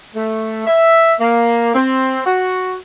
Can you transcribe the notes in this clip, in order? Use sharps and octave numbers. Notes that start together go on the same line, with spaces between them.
A3
E5
A#3
C4
F#4